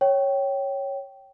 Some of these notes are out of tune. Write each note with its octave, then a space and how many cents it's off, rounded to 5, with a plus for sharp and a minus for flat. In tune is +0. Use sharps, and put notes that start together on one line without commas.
C#5 -5 G5 -15